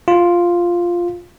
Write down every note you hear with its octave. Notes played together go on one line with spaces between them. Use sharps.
F4